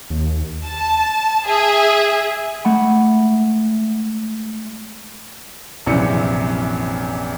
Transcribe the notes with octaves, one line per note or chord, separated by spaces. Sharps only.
D#2
A5
G#4 E5
G#3 A3 F#5 B5
A#1 F#2 C3 E3 C#7